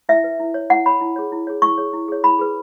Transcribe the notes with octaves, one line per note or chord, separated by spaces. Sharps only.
E4 E5
B4
E4
C#5
E4 F#5
C#5 B5
E4
G#4 C#5
E4
G#4 C#5
E4 C#6
G#4 C#5
E4
G#4 C#5
E4 B5
G#4 B4